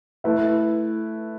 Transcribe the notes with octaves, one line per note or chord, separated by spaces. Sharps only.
A3 E4 B4 E5